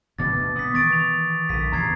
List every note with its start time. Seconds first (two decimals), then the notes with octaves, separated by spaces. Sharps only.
0.19 D2 B2 D6 A6
0.56 B3 D#6 B6
0.74 D#3 E3 C#6 A6 D7
0.92 F7
1.49 A#1 D3 B6 D#7
1.72 E2 A2 C3 A#5 G#6 C7